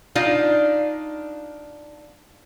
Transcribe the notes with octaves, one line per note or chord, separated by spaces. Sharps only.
D4 D#4 F4 F5